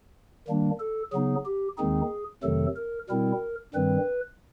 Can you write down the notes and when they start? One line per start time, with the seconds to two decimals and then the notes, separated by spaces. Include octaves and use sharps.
0.48 D#3 G3 A#3 D4
0.80 A4
1.12 C#3 F#3 B3 D#4 G#4
1.45 G4
1.78 D#2 D#3 G#3 C4 D#4 G#4
2.43 F2 C3 D#3 F#3 A3 A4
2.76 A#4
3.09 B2 G3 C4 E4 A#4
3.74 G2 D#3 G3 C4 B4